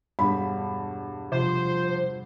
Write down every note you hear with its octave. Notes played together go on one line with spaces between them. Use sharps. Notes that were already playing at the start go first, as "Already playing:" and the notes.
E1 G2 B5
C3 F3 C5